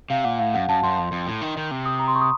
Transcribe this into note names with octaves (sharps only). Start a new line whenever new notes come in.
C3 F5
A#2 F#5
A2 F5
F#2 F#5
F#2 A5
F#2 C6
F2
F2
A2
D#3
D#3
C3
D#6
A#5
C6
C#6
D#6